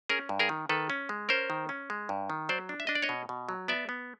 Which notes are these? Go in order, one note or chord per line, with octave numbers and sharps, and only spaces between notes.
C#4 G#4 A#4
G2
G#4 A#4
D#3
D#3 A4 B4
C#4
G#3
C#4 A#4 C5
D#3
C#4
G#3
G2
D#3
F#3 C5 D5
D4
E5
D4 D#5
D5
C#5 D#5
B2
B2
F#3
B3 D5 E5
B3